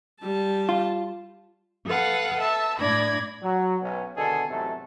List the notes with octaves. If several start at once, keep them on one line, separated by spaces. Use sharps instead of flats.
G3 A5
F4
A4 B4 F5 F#5
E5 A5
A2 D4 D5 B5 G#6 A#6
F#3
B1 B3 C#4
B2 D3 D#3 G#4 A4
E2 G#2 C3 F#3 A3 A4